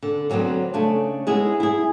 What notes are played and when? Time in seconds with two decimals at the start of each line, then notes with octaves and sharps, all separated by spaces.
0.03 D3
0.30 D3 F#3 G#3 B3 C4
0.74 C#3 A3 D4
1.27 G#3 B3 E4 G#4
1.60 E4 G#4